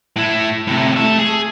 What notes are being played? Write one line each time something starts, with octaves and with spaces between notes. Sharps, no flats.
A2 E4
A2 C3
A3 E5
G#4